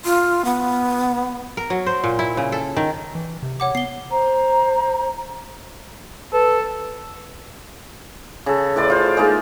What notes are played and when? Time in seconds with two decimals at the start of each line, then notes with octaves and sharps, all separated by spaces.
0.05 F4
0.45 B3
1.57 A#4
1.70 F#3
1.86 C5
2.04 A#2
2.19 E4
2.37 C#3
2.52 A4
2.76 D#3
3.15 E3
3.43 C3
3.60 C#5 F#5 D6
3.75 B3 C7 G7
4.10 C5 A#5
6.33 A4 B4
8.46 C#3 A4
8.76 A2 B4 D5 C6
8.90 F4 C5
9.17 G#3 A#3 D#4